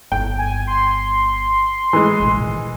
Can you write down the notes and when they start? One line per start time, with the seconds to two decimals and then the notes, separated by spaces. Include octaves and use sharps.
0.12 G1 E4 G5
0.38 G#5
0.67 C6
1.93 E3 G#3
2.19 A1 A#2
2.38 A#2 D#3